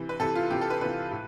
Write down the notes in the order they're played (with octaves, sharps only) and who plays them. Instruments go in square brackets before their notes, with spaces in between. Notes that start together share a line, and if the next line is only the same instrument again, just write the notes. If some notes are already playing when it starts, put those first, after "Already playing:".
Already playing: [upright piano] C3 E3
B4
C3 E3 A4
F4
C3 E3 G4
A4
B4
C3 E3 B4
A2